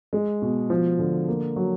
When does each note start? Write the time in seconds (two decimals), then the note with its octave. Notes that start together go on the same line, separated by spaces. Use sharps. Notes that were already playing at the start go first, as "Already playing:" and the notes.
0.13 G#3
0.42 B2
0.70 F3
0.99 D3
1.28 A#3
1.56 F#3